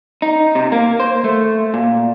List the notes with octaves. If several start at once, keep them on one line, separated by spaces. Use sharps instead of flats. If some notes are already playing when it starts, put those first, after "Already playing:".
D#4
C3
A#3
C5
A3
A#2